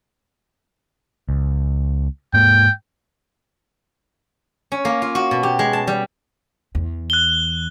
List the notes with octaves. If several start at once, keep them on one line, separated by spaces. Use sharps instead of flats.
C#2
G#2 A#3 G5
C#4
A#3
F4
F#4
B2
G4
G#3
A5
G3
E2
F#6 G7